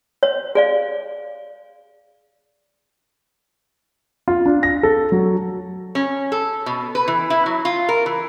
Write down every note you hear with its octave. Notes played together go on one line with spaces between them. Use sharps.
C#5
G#4 D5 F5
F4
D4
A#6
A4
F#3
C#4
A4
B2
B4
E3
E4
F#3
F4
A#4
E3